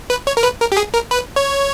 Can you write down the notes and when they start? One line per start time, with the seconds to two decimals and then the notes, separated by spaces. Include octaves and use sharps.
0.10 B4
0.27 C#5
0.37 A#4
0.43 B4
0.60 A#4
0.72 G4
0.77 G#4
0.94 A#4
1.11 B4
1.36 C#5